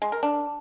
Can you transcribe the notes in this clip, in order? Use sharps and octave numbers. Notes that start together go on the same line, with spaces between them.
G#3
A#4
D4